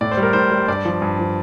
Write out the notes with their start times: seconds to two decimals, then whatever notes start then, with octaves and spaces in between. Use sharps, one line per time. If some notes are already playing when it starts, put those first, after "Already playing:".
0.01 A2 D5
0.12 C5
0.17 G3
0.23 A#4
0.33 A2 C5
0.51 G3
0.68 G2 D5
0.85 F3
1.02 G2
1.19 F3